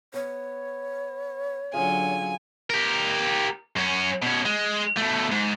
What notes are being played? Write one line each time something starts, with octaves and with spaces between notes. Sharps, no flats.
B3 C#5
D3 F#3 C#4 F4 G#4 G#5
G4 A#4
F#2 C#4
B2 C#4
G#3
B2 A3
G#2